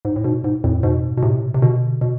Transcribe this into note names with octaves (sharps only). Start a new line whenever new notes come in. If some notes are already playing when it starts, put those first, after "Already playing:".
G#2
A2
G#2 B2
G#2
F2 A2
G#2 B2
B2
A2 C3
C3
B2 D3
B2